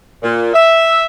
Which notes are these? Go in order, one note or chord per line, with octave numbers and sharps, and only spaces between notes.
A#2
E5